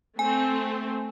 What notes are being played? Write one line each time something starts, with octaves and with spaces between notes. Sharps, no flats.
A3 C4 G#5